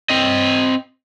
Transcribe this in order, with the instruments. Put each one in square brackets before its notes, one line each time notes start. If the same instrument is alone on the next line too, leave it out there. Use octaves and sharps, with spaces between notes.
[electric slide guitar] C4 D#5